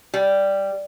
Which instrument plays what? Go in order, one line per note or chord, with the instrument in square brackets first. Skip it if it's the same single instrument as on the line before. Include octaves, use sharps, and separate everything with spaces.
[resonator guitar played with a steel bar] G3